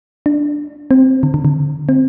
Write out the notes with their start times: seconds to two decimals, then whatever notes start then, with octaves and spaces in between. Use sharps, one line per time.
0.26 D4
0.91 C4
1.23 D3
1.34 D3
1.45 D3
1.89 C4